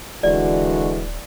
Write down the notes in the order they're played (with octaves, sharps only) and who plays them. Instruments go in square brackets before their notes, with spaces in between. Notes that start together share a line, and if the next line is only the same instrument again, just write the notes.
[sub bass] D1 [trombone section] D3 G#3 F#4 [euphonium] E3 [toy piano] D5